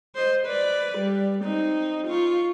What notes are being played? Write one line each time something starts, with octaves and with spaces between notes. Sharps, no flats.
C5 D#5
B4 D5
G3
C4 D#4
F4 C#6